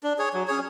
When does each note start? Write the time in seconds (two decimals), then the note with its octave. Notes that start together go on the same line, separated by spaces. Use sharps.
0.03 D4
0.18 G#4 C#5
0.33 F#3
0.48 C#4 G#4 C#5